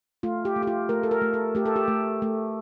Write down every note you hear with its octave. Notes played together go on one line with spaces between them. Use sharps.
A3 F4
G4
A3
G4
F4
A3 A#4
A4
A#4
A3
A4
A3 G4
A4
G4
A3
A3